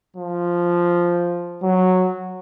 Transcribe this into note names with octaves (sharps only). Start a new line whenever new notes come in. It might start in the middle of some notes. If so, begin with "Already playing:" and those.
F3
F#3